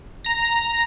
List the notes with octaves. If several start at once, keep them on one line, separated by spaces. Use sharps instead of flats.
A#5 A#6